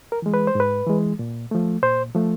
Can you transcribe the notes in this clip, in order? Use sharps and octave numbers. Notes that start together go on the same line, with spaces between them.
A#4
E3 G#3
B4
C5
G#2 B4
E3 G#3
A#2
F3 A3
A#2 C5
F3 A3